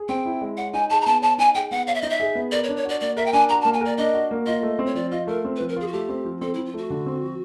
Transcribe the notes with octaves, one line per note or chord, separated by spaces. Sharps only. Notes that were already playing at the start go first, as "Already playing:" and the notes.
Already playing: G#4
C4 G5
E4
G#3
C#5 F#5
D#4 G#5
G#4 A5
A#5
B3 A5
C#5 A5
D#4 G#5
G#4 G5
B3 F#5
C#5 F5
E5
D#4 D#5
E5
G#4
B3
A#4 D5
C#5
D4
C#5
F#4 D5
A#3 D5
A#4 E5
G5
D4 G#5
F#4 A#5
A5
A#3
G#5
A#4 D5
D4 D#5
F#4
A#3
F4 D#5
A3
C4
C#5
F3 D5
F4 D#5
A3 A#4
C4
B4
F3
A#4
F4 G#4
F#4
A3 G4
C4
F3
C4 A4
F3 E4
F4
A3 F#4
D3
C4
F3